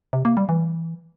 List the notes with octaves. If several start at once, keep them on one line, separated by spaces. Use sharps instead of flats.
C3
A#3
G3
E3